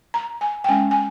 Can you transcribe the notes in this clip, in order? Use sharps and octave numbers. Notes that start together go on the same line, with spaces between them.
A#5
G#5
G5
G#3 C#4 G#5
G#5